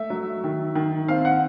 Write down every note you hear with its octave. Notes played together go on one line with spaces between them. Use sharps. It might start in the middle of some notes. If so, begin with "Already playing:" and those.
Already playing: A3 E5
F#3
D#3
D#3
C4 F5
F#5